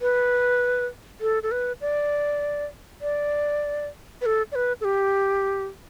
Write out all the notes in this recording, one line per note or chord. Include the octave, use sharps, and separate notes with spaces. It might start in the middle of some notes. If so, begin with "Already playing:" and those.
B4
A4
A4
B4
D5
D5
B4
A4
D5
B4
A4
G4